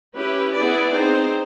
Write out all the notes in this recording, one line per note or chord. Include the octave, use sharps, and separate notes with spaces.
C#4 E4 G4 B4
B3 E4 G#4 B4 D5
C4 D#4 G#4 C5